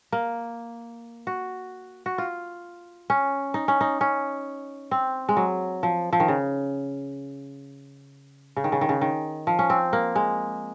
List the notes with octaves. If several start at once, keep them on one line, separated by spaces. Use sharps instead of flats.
A#3
F#4
F#4
F4
C#4
D#4
C#4
D#4
C#4
C4
G#3
F#3
F3
F3
D#3
C#3
C#3
D#3
C#3
D#3
C#3
D#3
F3
C#4
C4
A#3
G#3